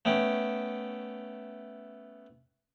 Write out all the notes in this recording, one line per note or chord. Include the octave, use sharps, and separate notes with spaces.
A3 B3 C#4 G5